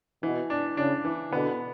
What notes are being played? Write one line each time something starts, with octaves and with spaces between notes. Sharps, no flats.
B2 E3
D4
C#3 D4
E3
B2 D3 B3